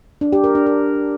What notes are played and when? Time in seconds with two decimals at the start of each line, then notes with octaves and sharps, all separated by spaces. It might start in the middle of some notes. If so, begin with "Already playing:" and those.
0.21 D4
0.33 G4
0.44 A#4
0.55 D4
0.66 A#4